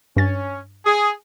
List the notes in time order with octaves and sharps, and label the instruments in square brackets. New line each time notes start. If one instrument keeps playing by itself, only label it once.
[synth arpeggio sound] G2 A6 [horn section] C#4
[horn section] G#4